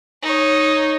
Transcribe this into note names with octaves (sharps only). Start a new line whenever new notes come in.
D#4 C#5